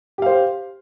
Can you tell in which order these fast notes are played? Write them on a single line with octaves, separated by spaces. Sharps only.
G4 F5 C5